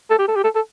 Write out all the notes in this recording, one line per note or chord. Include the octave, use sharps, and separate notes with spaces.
A4
G4
A4
G4
A4
A4